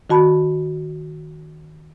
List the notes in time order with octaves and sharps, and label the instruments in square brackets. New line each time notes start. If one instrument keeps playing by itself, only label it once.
[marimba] D#3 F#4 A5 B5